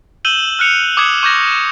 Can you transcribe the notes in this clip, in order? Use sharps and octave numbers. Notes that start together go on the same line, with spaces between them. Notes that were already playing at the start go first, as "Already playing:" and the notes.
E6 G6 D#7 E7 F#7 G7
F6 F#6 C#7 F7
D6 D#6 F#6 G#6 C#7
C#6 D6 G6 G#6 A#6